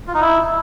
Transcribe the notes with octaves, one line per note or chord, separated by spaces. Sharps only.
F4
D#4
E4